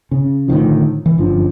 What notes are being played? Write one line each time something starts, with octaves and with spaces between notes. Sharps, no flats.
C#3
A2 D3 D#3 F3
E3
G1 F#2 F3 D4